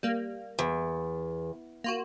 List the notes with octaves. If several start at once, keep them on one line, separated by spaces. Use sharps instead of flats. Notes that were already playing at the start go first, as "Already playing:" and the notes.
G3 A#3
E2
A#3 F4 F#4